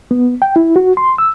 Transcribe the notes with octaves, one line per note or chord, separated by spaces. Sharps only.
B3
G5
E4
F#4
C6
E6